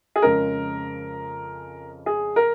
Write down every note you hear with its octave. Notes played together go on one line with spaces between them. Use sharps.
G#4
F2 C#3 G#3 C#4 A#4
G#4
A#4